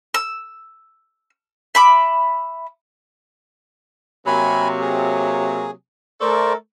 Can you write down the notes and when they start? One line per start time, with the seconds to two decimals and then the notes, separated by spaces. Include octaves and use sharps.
0.14 E6
1.75 E5 B5 D6
4.27 C3 F#3 A#3 G#5 B5
4.81 G#4
6.21 A3 A4 A#4 C5 D5 C#6